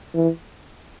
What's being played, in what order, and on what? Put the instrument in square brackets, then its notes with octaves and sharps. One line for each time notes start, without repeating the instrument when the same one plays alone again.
[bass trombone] E3